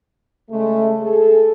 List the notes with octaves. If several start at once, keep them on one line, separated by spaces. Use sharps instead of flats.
C#3 G#3 A3
G#4 A4